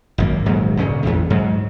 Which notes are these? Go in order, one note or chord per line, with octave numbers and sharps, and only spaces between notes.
G#1 F#2 A#3
D#1 G#2 F#3
C#2 A#2 C#4
A1 E2
G#2 F#3